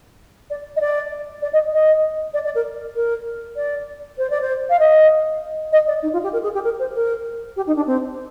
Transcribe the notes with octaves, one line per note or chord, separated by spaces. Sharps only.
D5
D#5
D5
D5
D#5
D#5
D5
D5
A#4
A#4
D5
C5
D5
C5
F5
D#5
D#5
D5
D#4
F4
G4
A#4
G#4
G4
A#4
C5
A#4
G4
D#4
D4
C4